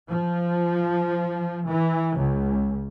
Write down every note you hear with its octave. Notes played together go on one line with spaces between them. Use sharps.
F3
E3
C#2